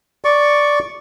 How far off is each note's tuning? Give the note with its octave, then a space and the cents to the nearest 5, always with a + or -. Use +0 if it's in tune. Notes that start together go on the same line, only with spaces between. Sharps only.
D5 -5 C#6 +0